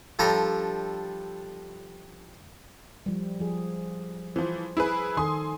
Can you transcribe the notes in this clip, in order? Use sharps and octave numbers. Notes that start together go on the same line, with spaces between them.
F3 G3 D4 A4 A#5
F3 G3
F3 G#4
E3 F3 C5
E4 G#4 B4
D#3 A4 G#5 C6 D#6